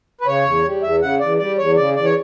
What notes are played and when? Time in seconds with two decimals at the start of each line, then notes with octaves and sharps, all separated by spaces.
0.21 B4
0.26 C#3 C#5
0.45 E2
0.65 G3
0.82 E2 E5
1.01 C#3 F#5
1.20 E2 D5
1.39 G3 D5
1.58 E2 C#5
1.76 C#3 D5
1.96 E2 D5
2.05 C#5